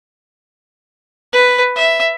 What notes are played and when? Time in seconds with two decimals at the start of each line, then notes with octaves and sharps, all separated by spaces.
1.33 B4
1.75 E5